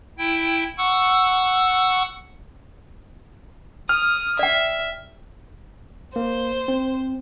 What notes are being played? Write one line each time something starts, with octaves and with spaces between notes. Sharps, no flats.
E4 G5
F#5 C#6 E6
D#6 F6
D5 E5 G5
A#3 C5
C4